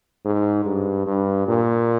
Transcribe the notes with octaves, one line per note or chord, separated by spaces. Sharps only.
G#2
G2
G2
A#2